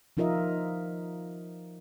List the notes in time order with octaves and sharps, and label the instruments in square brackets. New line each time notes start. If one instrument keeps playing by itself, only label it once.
[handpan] F3 D#4 F4 A#4 D#5 E5